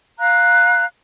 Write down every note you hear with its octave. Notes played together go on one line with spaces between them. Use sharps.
F5 A#5 F#6